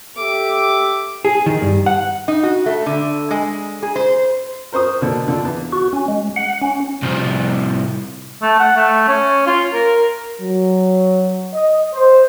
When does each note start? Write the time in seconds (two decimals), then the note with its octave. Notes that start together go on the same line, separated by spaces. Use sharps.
0.17 G4 A4 E5 D6
1.25 G#4
1.46 D#3
1.62 G2
1.86 F#5
2.28 D#4
2.43 F#4
2.66 A3
2.86 D3
3.31 G#3
3.83 G#4
3.96 C5
4.72 A#4 C5 C#6 D#6
5.01 B2 D3 A#3
5.28 D3 F4
5.45 E2
5.72 F#4
5.93 C#4
6.08 G#3
6.36 F#5
6.62 C#4
7.02 C2 F3
8.42 A3
8.60 F#5
8.76 A3
9.08 C#4
9.46 F4
9.73 A#4
10.41 F#3
11.54 D#5
11.94 C5